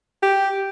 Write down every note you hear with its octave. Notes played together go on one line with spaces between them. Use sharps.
G4